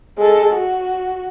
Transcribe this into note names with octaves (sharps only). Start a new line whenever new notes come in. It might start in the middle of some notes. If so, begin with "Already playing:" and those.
G#3 A4
F#4